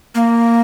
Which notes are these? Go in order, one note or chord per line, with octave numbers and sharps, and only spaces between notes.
A#3